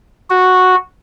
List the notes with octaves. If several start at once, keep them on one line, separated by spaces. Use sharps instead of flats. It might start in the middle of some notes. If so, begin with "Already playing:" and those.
F#4